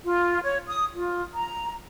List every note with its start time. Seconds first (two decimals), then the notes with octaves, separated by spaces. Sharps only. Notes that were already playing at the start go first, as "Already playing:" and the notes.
0.04 F4
0.43 C#5
0.67 D#6
0.95 F4
1.34 A#5